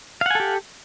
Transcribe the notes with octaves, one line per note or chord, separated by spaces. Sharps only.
G4 A4 F5 F#5 G#5